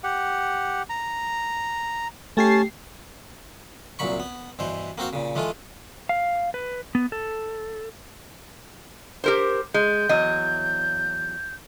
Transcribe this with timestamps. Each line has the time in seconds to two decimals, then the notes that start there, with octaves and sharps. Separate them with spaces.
0.03 G4 F#5
0.89 A#5
2.37 A3 C#4 G4 A5 C7
3.99 C2 A#2 F#3 B5 C#6
4.20 B3
4.59 G2 B2 E3 C5
4.98 A#3 C4 F#4 C5 F5
5.13 A#2 C#3
5.35 E3 G#3 A3 F4
6.09 F5
6.54 B4
6.95 B3
7.12 A4
9.24 G4 A#4 C5
9.74 G#3 G6
10.09 E2 F#3 D#5